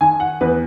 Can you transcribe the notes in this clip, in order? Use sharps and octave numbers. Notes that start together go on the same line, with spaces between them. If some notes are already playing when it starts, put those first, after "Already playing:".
D#3 G#5
F#5
E2 B4